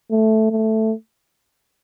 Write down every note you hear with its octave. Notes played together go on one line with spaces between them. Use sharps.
A3
A3